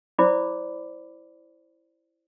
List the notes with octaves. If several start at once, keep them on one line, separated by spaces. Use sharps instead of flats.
E4 C5 D5 B5 D6